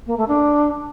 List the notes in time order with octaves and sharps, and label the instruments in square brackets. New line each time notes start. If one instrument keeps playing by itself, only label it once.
[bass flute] A#3
A3
D4